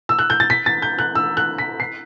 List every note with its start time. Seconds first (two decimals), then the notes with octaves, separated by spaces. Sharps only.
0.09 E6
0.19 F#6
0.30 G6
0.40 A6
0.50 B6
0.66 A6
0.82 G6
0.99 F#6
1.15 E6
1.37 F#6
1.58 B6
1.80 C7